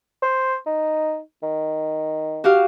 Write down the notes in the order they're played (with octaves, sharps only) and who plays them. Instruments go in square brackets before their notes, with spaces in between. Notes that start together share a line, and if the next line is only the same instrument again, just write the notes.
[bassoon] C5
D#4
D#3
[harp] F#4 G4 F5